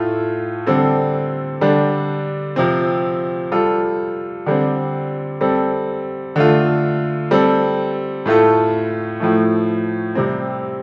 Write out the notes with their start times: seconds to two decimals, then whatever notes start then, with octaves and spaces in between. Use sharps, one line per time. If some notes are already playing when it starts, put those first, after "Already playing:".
Already playing: A2 A3 F4 A4
0.67 D3 G3 C4 A4
1.61 D3 G3 D4
2.56 C3 F3 C4
3.52 G3 F4 A4
4.46 D3 G3 C4
5.41 G3 C4 A4
6.36 D3 A3 F4
7.31 G3 C4 A4
8.26 A2 A3 F4 A4
9.20 A2 F3 A3
10.15 C3 G3 C4